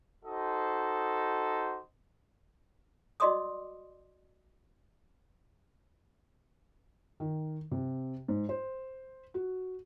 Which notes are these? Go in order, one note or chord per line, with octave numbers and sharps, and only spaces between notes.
D#4 F#4 A4 C5 D#5
F#4 D5 D#5 C6 D6 D#6
D#3
C3
G#2
C5
F#4